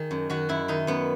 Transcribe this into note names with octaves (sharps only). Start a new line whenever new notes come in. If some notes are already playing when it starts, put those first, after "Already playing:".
Already playing: D#3 G#4
F#2
D#3 F#4
F#2 E4
D#3 D#4
F#2 B3